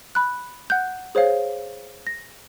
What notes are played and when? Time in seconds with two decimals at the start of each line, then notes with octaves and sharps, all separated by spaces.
0.15 B5 F#6
0.70 F#5 F#6 G6
1.15 G#4 C5 C#5 F5
2.07 A#6